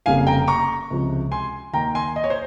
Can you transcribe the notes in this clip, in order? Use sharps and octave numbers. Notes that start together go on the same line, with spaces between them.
F1 F2 C#3 G3 A#3 F5 G#5
G5 A#5
A#5 C#6
C#2 C3 F3 G#3
G#5 C6
D#2 D#3 A#3 G5 A#5
G#5 C6
D#5
C#5
C5